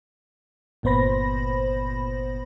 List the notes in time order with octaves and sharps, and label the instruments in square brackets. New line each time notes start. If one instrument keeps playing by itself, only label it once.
[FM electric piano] G1 A#2 B3 C5 B5 A#6